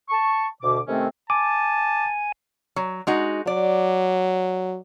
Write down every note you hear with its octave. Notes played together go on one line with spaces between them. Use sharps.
A5 C#6
D2 B2 D6
C3 D#3 A3 C4 C#4 A4
G#5 A5 D6
F#3
G#3 D#4 F#4
F#3 D5